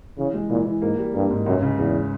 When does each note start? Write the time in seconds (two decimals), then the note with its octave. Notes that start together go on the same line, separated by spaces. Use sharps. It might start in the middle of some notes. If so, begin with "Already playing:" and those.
0.18 C#3 E3
0.34 G#3
0.49 A#2 E3
0.65 E3
0.82 G#2 A#3
0.98 G3
1.14 G2 A#3
1.30 G#2
1.46 C#2 F#2
1.62 C#3
1.78 E2 C#3